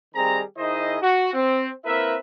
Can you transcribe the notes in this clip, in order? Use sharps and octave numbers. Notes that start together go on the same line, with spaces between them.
D#3 G3 C4 G#4 A#5
D#3 D#4 E4 G#4 C5 D#5
F#4
C4
A#3 C4 E4 A#4 B4 E5